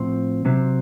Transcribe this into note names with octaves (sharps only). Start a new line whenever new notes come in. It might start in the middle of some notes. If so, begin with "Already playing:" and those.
Already playing: A2 F3 C4
C3 F#3 C4